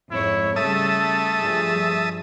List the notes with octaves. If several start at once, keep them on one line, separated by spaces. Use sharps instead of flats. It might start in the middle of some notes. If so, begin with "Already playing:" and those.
F2 G#2 E4 C#5
C#3 G3 A3 E5 A5 D#6
G2 F3 G#4